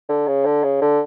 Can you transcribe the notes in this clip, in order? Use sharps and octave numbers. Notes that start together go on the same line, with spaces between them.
D3
C#3
D3
C#3
D3